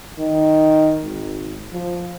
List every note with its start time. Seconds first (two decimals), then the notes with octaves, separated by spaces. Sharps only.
0.19 D#3
1.04 G#1
1.72 F3